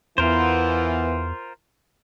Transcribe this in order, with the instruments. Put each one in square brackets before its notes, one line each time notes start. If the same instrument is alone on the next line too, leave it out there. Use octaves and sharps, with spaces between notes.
[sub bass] E2 [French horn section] E3 B3 [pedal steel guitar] F4 A#4 C5